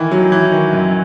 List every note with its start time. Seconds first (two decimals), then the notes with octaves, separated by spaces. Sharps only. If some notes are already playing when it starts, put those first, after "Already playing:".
Already playing: D#3 E3
0.12 F#3
0.32 E3
0.52 D#3
0.73 F#2